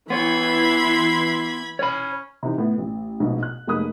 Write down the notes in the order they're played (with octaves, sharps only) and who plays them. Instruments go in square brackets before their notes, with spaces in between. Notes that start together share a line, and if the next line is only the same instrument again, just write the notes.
[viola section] E3 E4 [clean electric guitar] B3 C#5 [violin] B5 G#6 [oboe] C6
[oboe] C#4 [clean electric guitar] C#5 B5
[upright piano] C3 E3 D#4
A2 B3
A1
A#1 G#2 B2
F#6
F1 G#3 A#3 B5 D#6 F#6